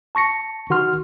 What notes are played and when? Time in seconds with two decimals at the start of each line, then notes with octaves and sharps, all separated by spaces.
0.15 A5 C#6 A#6 C#7
0.70 D#3 F#4 F#5 C6 F6